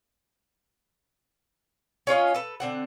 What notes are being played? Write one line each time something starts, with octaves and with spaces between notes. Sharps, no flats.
C#4 F4 C#5 D#5
A4 B4
D3 C4 F#5